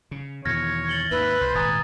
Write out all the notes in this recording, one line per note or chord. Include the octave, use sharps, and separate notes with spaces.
C#3
E2 B2 D#3 C#5 F6 G#6 A#6
A6 F#7 G7
D#2 G#2 D#3 B4 E5
C2 C5
D#1 G#1 G#5 A#5 D#6 A6